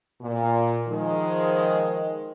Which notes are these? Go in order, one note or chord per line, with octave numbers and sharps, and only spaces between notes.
A#2
D#3 F3 G#3